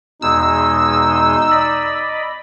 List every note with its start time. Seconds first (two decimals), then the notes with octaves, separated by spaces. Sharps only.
0.22 E2 B2 G#3 D#4 E6
1.51 D5 D#5 B5